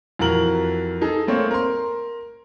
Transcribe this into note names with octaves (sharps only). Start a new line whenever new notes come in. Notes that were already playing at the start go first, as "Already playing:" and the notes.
F2 E3 F#4 A#4 F#7
D#4 G#4 A4
A3 A#3 C4 C#5
A#4 C6